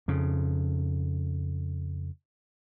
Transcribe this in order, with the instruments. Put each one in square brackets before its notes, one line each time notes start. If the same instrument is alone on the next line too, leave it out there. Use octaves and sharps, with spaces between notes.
[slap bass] F2 C#3